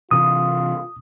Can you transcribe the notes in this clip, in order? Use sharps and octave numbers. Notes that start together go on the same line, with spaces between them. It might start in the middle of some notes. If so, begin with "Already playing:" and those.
C3 E3 F4 D#6